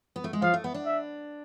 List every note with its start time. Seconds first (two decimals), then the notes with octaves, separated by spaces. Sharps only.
0.16 B3
0.24 A3
0.33 G#3
0.42 F3 F5
0.54 A3
0.64 B3
0.74 D4
0.85 E5